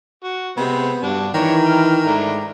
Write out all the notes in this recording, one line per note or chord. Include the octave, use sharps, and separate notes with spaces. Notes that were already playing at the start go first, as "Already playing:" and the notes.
F#4
C3 G#3 B3 C4
G2 D4 F#4 A5
D#3 E3 D4 C#5 A#5
G5 F6
G#2 A3 D4 E4